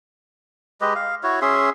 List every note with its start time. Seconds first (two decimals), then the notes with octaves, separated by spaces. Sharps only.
0.81 G#3 G4 B4 D#5
0.95 F5
1.23 E4 F#4 C#5
1.42 C#4 G#4 E5 C6